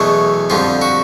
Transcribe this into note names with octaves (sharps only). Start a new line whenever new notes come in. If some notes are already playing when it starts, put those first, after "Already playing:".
Already playing: E2 B2 F#3 A3
F2 D3 G3 F4
F#4